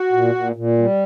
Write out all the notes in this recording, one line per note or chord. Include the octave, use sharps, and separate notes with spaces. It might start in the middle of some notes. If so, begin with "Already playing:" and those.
Already playing: F#4
A#2
A#2
A#2
G3